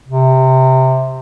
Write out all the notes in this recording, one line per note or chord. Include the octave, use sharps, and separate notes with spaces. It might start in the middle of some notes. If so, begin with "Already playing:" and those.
C3